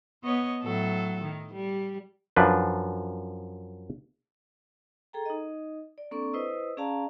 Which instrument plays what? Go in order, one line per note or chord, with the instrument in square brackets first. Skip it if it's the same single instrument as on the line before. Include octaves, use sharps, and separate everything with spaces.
[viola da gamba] B3 C#5 D#5
A2 F#3 A4
D#3
G3
[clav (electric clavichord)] F#2 F3 D4 B4
[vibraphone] G#4 A4 G5 A#5
D#4 D#5
D5
A#3 C4 D4 A4 D5 C#6
E4 B4 C5 D#5 D#6 E6
C#4 G#4 D5 F5 A5 A#5